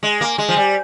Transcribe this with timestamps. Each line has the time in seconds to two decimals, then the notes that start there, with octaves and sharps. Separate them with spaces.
0.03 G#3
0.21 A#3
0.38 G#3
0.49 F3
0.56 G3